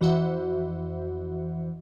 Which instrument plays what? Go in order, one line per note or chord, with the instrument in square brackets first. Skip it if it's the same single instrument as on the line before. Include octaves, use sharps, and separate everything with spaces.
[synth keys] F2 E3 F#4 C5 E5 F#5